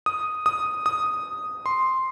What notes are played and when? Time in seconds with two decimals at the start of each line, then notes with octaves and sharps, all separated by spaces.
0.06 D#6
0.46 D#6
0.86 D#6
1.66 C6